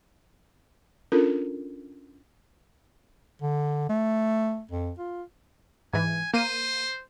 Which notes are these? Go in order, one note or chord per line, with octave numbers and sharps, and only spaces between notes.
C#4 D4 F4 A4 A#4
D3
A3
F2
F4
G#2 E3 G#5
A#3 C5 D#7